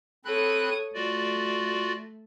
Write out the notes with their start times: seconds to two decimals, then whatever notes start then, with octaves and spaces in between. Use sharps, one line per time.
0.25 C4 A4 C#5 B5 D#6 F#6
0.95 A3 F4 F#4 D5